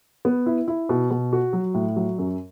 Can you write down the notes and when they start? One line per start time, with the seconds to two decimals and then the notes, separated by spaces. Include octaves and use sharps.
0.25 B3
0.46 E4
0.68 E4
0.89 B2
1.11 B2
1.33 F#4
1.53 F#3
1.74 A2
1.96 F#3
2.18 F#2